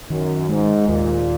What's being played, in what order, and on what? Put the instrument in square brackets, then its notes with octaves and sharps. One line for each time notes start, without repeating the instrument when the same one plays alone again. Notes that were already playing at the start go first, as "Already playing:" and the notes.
[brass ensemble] F#2 [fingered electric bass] D#3
[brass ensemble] G#2 [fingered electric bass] G#3
[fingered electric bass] D#2 [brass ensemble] A#2